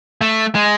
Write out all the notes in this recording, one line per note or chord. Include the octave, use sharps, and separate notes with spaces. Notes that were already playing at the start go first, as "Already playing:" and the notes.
A3
G#3